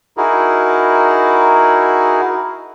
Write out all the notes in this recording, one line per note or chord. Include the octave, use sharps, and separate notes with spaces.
D#4 E4 F#4 G#4 A#4